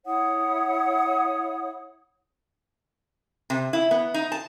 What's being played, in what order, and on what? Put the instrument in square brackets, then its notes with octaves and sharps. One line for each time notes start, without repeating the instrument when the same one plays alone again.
[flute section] E4 C#5 F#5 D#6
[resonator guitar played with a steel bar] C3
E4
B3
D#4
A5